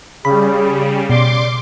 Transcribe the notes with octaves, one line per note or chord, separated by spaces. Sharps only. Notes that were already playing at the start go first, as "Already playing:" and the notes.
C#3 G3 G#4 B5
B2 D5 C6 D6